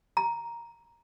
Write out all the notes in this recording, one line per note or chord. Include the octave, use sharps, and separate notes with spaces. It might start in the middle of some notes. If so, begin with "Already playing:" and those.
A#5